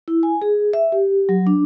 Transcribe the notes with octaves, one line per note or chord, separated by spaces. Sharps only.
E4
G#5
G#4
E5
G4
F#3
D4